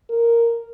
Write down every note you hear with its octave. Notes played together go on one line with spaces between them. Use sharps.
A#4